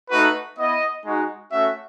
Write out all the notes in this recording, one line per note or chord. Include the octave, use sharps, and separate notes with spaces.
A3 D#4 F#4 B4
B3 E4 D#5
G#3 D#4 F#4
A3 C#4 F#4 E5